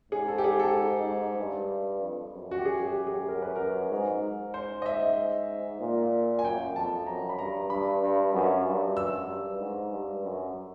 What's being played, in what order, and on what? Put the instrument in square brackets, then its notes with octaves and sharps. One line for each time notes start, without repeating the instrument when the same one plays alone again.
[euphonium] G#2 [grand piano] G#4
[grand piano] A4
G4
G#4
A4
[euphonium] G2
F2
F#2
[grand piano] F#4
G4
G#4
G4
G#4
A#4
B4
A#4
[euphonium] G#2
G#2
[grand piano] C5
D#5
E5
[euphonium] A#2
[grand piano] G#5
[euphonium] F#2 [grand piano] G5
[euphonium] F2 [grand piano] A5
[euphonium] F#2 [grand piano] A#5
[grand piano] B5
[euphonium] G2 [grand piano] A#5
[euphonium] G2 [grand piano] B5
[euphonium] G2
F#2
G2
[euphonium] F#2 [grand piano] E6
[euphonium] G2
G#2
G2
F#2